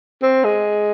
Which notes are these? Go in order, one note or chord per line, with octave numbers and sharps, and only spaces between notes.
C4
G#3